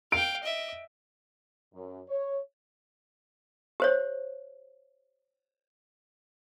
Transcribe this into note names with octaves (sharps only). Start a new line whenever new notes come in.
F5 G5 D7
D#5 E5
F#2
C#5
G4 C5 C#5